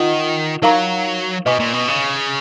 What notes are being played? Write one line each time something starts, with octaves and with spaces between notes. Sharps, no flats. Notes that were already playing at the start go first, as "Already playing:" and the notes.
Already playing: D#3 F4 D#5 F#5
F#3 D#4 A#4 F5 A#5 C#6
B2 B4 D#5 G#5 C#6
A#2
B2
C#3